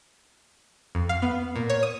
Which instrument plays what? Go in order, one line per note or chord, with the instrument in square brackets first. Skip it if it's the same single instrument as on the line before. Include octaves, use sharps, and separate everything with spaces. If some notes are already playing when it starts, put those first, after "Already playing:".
[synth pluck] F2
F5
B3
A#2
C#5
D#6